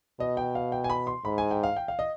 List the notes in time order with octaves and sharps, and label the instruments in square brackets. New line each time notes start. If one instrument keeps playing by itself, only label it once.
[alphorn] B2 [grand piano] D#5
[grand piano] G5
F5
G5
G#5
B5
C6
[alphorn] G#2 [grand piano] B5
[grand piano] G#5
G5
F5
G5
F5
D#5